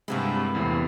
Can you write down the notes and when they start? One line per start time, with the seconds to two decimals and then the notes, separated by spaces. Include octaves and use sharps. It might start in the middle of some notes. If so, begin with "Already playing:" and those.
0.08 G2 C3 G#3 A#3 B3 E4
0.55 E2 A2 C3